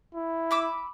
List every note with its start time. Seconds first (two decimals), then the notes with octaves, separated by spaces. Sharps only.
0.15 E4
0.51 B5 D6 E6